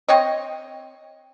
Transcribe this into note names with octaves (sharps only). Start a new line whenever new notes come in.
C4 C#5 D#5